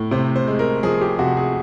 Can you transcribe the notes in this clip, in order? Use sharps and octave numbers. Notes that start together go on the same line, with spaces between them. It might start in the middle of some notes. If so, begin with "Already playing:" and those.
Already playing: A2
C3 C5
C5
G#3
A#4
F3 G#4
G4
C3 F#4
G#4